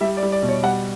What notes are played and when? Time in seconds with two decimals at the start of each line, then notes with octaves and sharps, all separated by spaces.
0.01 G3 E5
0.17 D5
0.22 G3
0.32 D5
0.42 B2
0.48 C#5
0.63 G3 F#5